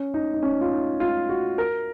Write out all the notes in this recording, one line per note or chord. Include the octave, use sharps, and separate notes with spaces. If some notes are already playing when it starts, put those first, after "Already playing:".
Already playing: C#4
D#4
D#4
C#4
F4
D#4
F4
F#4
A#4